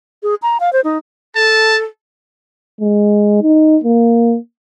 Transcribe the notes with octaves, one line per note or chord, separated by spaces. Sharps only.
G#4
A#5
F5
C5
D#4
A4 A5
G#3
D#4
A#3